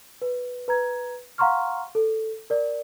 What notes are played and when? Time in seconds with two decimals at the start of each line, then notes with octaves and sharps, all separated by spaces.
0.22 B4
0.68 B4 A#5 G#6
1.38 F5 F#5 A#5 C6 C#6 F6
1.95 A4
2.50 A#4 D5